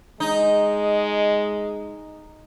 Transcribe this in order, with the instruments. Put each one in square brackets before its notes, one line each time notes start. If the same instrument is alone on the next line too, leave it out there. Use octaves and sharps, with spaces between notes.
[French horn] G#3 [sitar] D#4